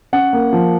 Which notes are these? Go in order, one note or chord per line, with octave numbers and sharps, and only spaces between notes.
C#4 F#5
A#3
F3